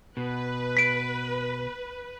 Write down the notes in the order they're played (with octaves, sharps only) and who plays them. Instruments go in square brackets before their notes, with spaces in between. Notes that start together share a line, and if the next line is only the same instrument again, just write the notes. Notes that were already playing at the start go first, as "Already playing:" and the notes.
[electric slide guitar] B2 [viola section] B4
[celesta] B6 D7